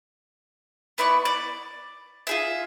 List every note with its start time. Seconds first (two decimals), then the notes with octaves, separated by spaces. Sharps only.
0.98 B3 E4 D5 C#6
1.25 D5
2.27 F4 G#4 E5